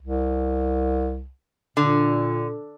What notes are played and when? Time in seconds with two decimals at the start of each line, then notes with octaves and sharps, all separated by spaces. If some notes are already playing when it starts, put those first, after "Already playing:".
0.01 C2
1.77 A#2 D3